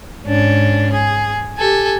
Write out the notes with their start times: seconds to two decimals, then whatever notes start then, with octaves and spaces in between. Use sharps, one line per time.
0.23 G#2 C#4 D4
0.92 G#4
1.57 G4 A4 G#5